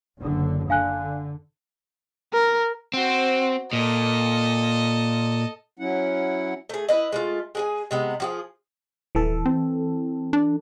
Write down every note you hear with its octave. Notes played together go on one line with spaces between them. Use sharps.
F#1 D3
D3 F5 G#5 F#6
A#4
C4 F#4 C5
A#2 A4 D#5
F#3 C#4 E4 F#5
A3 G#4
E4 B4 D#5
G#3 A3 F4
G#3 G#4 G#5
C3 G#3 B3
F3 F#4 G#4
D#1 E3 A4
C4
D4